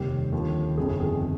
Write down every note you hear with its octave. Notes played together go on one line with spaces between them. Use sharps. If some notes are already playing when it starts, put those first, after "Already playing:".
Already playing: F1 D#2 D#3 G3 G4
D#2 D3 F3
G1 F2 C3 D#3 G3 G#4
G#4